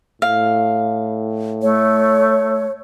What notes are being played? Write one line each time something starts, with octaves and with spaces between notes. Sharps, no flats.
A2 F5
A3 C#5